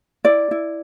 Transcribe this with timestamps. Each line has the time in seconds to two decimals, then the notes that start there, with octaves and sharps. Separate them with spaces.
0.25 E4 D5
0.51 E4